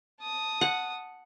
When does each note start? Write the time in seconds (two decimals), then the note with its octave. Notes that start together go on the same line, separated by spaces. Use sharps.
0.21 A5 D#6
0.61 F#5